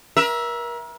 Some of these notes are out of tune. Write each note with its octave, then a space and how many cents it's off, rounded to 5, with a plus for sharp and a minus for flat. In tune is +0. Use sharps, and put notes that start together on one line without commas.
A#4 +35 E5 +0